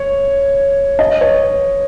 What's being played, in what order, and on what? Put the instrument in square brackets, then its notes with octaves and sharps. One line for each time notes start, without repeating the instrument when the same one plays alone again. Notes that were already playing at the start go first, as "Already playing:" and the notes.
Already playing: [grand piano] C#5
D#5
C#5